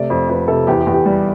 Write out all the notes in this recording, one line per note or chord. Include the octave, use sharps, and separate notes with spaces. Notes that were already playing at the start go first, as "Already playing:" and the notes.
Already playing: C3 A3 D5
F2 C5
F2 B4
C3 A4
E2 G4
G4
E2
G4
G3